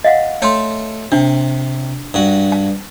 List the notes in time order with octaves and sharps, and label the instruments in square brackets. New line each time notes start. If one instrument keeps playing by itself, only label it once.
[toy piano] D#5 F5 F#5
[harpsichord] A3 A4 [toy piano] C#5 C6
[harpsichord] C3 [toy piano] D4
[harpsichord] G2 F#4
[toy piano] A5